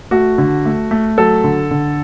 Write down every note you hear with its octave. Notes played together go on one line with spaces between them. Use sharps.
A3 F#4
D3
A3
A3
F#3 A4
D3
D3